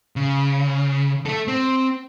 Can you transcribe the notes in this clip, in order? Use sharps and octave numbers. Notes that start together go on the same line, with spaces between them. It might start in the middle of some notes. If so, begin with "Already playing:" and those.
C#3
A3 A4
C4